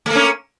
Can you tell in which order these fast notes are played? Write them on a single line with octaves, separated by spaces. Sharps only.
A3 A#3 C#4